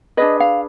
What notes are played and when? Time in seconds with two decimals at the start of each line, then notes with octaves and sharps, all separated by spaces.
0.17 D4 G#4 B4 D#5
0.40 F5